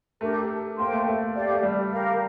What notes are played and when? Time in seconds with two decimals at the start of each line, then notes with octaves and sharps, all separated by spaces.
0.21 A3 D4 G4 A#4
0.78 A#3 C5 G5 C6
0.92 A3
1.07 A3
1.35 G4 D5 F5
1.54 A3
1.63 G3
1.92 G4 A#4 F5